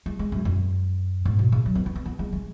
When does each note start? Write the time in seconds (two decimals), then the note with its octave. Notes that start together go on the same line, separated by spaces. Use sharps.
0.06 G#3
0.19 G#3
0.32 F#2
0.45 F#2
1.25 G#2
1.39 B2
1.52 C#3
1.66 F#3
1.75 B3
1.86 C#4
1.95 B3
2.06 B3
2.19 G#3
2.33 G#3